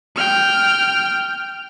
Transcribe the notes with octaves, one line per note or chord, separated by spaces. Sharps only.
G5 F6